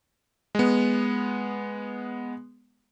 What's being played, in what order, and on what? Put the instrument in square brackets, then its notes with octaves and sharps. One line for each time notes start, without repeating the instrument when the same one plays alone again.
[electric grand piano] G#3 B3